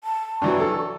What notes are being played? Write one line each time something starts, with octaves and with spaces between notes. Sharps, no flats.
A5
G2 E3 F#3 C#6
A4